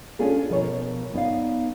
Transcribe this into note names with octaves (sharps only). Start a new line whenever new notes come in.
C#4 D4 F4 G#4 A4
B2 F3 A#4 C#5
B3 D#4 C#5 D5 F5